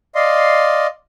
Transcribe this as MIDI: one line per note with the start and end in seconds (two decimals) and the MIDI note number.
0.15 0.87 74
0.15 0.87 75
0.15 0.87 77
0.15 0.87 84